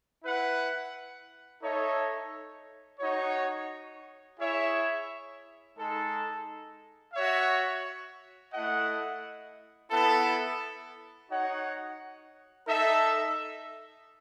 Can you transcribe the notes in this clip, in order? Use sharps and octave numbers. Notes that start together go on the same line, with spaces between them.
E4 B4 F#5
D#4 A4 C#5 E5
D#4 F#4 C#5
E4 G#4 C#5 E5
G#3 D#4 A4
F#4 C#5 E5
A3 E4 A4 D#5 F#5
B3 E4 A4
D#4 F#4 C#5 F#5
D#4 A4 E5